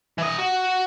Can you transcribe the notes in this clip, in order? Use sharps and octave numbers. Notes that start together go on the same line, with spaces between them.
E3 D#5
F#4